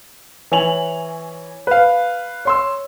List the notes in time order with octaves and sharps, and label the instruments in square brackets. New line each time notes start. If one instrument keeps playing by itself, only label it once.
[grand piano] E3 C#5 G#5 F7 F#7
B4 F5
C#5 C6 E6